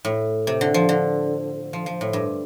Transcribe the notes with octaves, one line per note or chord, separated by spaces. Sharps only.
A2
C3
D3
F3
D3
F3
F3
A2
G2